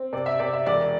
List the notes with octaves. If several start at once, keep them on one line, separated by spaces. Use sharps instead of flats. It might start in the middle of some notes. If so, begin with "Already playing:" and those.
Already playing: C4
C3 D5
E5
C3 D5
E5
E1 D5